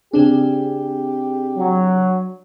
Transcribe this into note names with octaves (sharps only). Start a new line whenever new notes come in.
C#3 C4 D4 G4 G#4
F#3